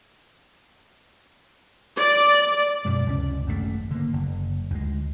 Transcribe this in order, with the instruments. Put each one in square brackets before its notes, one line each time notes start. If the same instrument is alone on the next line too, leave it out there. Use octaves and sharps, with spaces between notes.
[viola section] D5
[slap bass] F#2 B2 G#3
C#2 C3 F3 C#4
G#1 F#2 C3 A3
D3 A#3
F#1
D2 G#3